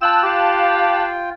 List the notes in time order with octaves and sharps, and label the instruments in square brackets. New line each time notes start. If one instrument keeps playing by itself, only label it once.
[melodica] F4 G5 [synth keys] A5 F#6 E7 [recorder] E6
[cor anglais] G4 [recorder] F5